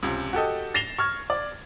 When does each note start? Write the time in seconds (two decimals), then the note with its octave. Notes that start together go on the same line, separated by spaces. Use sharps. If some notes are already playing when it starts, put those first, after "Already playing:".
0.03 C#2 C3
0.33 F#4 G4 A4 D#5
0.74 A6 A#6 C7 E7 F7 G7
0.99 C#6 F6 G#6
1.30 D5